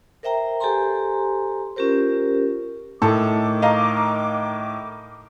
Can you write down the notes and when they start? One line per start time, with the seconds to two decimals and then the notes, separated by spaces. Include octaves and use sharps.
0.23 A#4 C5 E5 G5 A#5
0.60 G4 A4 C5 G#5 A#5 C6
1.76 C#4 F4 G4 A#4 C5
3.02 A2 D#3 A4 D6
3.62 D#5 F5 A#5